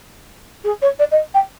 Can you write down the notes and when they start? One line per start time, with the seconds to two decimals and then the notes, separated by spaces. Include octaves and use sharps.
0.64 G#4
0.81 C#5
0.99 D5
1.11 D#5
1.34 G5